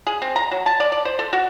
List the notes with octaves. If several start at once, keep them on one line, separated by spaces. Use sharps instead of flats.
G#4
C4
A#5
F#3
A5
D5
D5
C5
A4
F#4